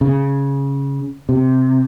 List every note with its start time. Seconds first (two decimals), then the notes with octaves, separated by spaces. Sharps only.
0.01 C#3
1.29 C3